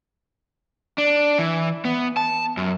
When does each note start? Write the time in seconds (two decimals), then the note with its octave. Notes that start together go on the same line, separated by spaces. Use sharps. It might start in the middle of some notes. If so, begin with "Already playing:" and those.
0.98 D4
1.39 E3
1.85 B3
2.17 A5
2.57 F#2